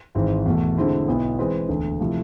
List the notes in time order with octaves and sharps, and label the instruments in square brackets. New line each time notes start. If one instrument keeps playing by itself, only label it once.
[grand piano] G#1 G#2 E3 G#3 C4
E2 B2 A3
D3 G#3 C4 E4
B1 B2 B3 E4
E3 G#3 C4 G#4 B4
E1 D2 D3
C3 F3 A3 E4